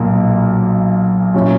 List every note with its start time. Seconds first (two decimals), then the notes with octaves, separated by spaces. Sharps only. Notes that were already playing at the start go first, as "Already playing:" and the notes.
Already playing: B1 A#2 A#3
1.34 A#2 F#3 C#4 E4